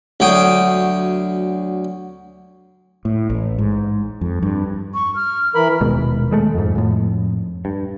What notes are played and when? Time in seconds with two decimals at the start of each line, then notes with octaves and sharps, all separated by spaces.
0.20 D2 F#3 G5 D#6
3.05 A2
3.30 A1
3.58 G#2
4.21 F2
4.42 G2
4.94 C#6
5.15 F6
5.55 E3 A#4 B5
5.81 D#1 B2 G#3
6.31 D#3 G#3 A3
6.55 F2 G#2
6.75 F2 A2
7.65 G2